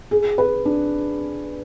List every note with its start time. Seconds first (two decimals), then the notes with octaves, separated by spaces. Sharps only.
0.11 G#4
0.38 B4
0.65 D4